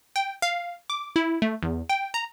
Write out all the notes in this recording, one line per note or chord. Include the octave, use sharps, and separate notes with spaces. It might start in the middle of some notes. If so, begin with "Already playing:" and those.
G5
F5
D6
E4
A3
E2
G5
A#5